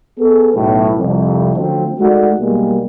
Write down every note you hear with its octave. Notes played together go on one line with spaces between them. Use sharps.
B3 G#4 A4
B1 A2
C2 F2
D3 F3 F#3 A3 C4
G#3 A3 D#4 F#4 D5 F#5
B1 G3 G#3 A#3